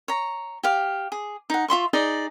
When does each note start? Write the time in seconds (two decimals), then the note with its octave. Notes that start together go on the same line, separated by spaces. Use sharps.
0.08 C#5 A#5
0.63 G4 F5
1.12 G#4
1.50 D#4 F#5
1.68 F4 E5 C6 C#6
1.93 D#4 G#4 D5 D#5